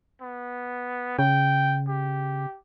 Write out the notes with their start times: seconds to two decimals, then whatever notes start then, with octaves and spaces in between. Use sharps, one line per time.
0.21 B3
1.19 C#3 G5
1.88 G4